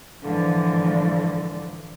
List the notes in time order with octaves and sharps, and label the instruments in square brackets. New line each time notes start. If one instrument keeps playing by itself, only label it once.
[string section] G#2 D3 E3 F3